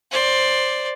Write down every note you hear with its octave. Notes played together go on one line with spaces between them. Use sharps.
C5 D5